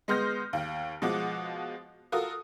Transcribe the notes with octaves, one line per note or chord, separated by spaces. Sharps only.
G#3 B3 C6 F6 G6 A#6
D#2
B2 F3 G#3 F#5 D6
F4 F#4 A4 A#4 D#6